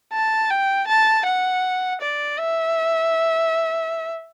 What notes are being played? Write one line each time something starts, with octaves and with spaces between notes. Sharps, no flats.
A5
G5
A5
F#5
D5
E5